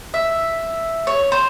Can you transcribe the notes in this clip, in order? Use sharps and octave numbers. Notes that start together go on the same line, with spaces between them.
E5
C#5
C5